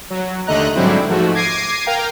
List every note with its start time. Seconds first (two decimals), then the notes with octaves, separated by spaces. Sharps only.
0.10 F#3
0.47 D#2 D3 A3 D#5 A#5 F#6
0.75 G#2 D3 F#3 G3 C4 E4
1.09 G#2 F3 A3 F#4
1.34 D6 G#6 A#6 C7 D7 D#7
1.86 A#4 F5 G5 A#5